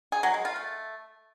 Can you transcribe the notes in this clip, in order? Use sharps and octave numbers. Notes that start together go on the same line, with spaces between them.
G#4
F#3
G#3
F4
A3